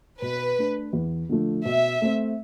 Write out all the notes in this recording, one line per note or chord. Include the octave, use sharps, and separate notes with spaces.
B2 B4
A3 D4
E2
D3 F3 A3
B2 E5
A3 C4